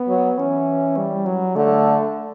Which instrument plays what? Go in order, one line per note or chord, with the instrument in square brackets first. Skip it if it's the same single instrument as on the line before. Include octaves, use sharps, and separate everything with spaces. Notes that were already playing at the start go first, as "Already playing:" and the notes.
Already playing: [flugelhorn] B3
[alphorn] F#3
[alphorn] E3 [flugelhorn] C#4
[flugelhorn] G3
F#3
[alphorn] D3 [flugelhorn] A3